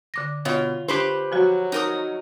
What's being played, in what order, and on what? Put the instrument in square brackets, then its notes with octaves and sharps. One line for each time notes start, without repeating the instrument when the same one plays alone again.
[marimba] D3 D6 A#6
[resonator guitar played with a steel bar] B2 [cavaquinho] F4 [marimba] C#5
[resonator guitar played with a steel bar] G4 B4 C5
[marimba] F3 F#4 [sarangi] F#3
[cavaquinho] D#4 A#4 D#6